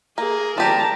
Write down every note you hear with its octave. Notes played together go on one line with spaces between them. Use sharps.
A#3 G#4 A#4
F3 G4 D5 A5 A#5